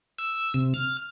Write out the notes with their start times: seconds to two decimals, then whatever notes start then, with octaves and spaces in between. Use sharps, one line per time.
0.18 E6
0.54 C3
0.74 F6